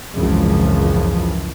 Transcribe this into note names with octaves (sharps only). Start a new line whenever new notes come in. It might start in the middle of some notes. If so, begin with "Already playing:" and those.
G#1 C#2 F#2 C#3 E3 F3